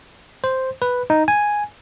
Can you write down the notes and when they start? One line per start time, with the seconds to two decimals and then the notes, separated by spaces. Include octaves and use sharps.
0.44 C5
0.82 B4
1.10 D#4
1.28 G#5